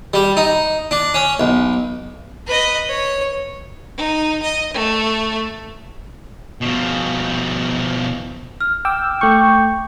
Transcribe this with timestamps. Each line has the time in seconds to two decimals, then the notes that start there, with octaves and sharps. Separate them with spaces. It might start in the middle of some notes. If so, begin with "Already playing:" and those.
0.14 G3
0.37 D#4
0.91 D4
1.14 C#4
1.40 B1
2.47 B4 D#5
2.88 C#5
3.97 D#4
4.43 D#5
4.73 A3
6.61 B2 F3
8.61 F6
8.85 G5 D6 E6
9.21 A3 G5 C#6 D6 G6